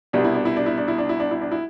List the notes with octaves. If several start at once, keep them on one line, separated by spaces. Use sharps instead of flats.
C2 B2 G3 D4
E4
D4
E4
D4
E4
D4
E4
D4
E4
D4
E4
D4
E4